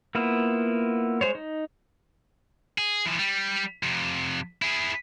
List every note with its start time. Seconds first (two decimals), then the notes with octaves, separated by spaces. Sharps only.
0.15 A#3 B3 E4 F4
1.21 G#3 C5 C#5
1.35 D#4
2.78 G#4
3.06 E3 F3
3.19 G3
3.83 F2 C3
4.62 E4 G#4